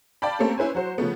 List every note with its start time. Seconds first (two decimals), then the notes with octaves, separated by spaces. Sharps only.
0.22 D5 F5 G5 A5 B5
0.39 A3 A#3 C4 C#4 G4 A4
0.58 C#4 E4 B4 C5 G#5
0.75 F#3 F#4 C5
0.98 C#3 F3 A3 B3